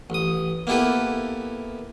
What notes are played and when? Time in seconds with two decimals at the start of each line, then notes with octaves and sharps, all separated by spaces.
0.10 A1 D#6
0.67 A#3 B3 E4 G4 A4 B4